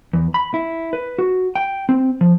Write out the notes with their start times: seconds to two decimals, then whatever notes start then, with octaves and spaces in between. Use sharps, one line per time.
0.13 E2
0.34 B5
0.54 E4
0.93 B4
1.19 F#4
1.55 G5
1.89 C4
2.21 F3